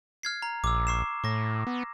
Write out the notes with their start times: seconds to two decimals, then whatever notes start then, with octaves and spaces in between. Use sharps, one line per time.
0.23 F6 G#6 C7
0.42 A#5
0.64 A#1 D6 E6
0.87 C#6 C7 E7
1.24 A2 C#6 A#6
1.67 B3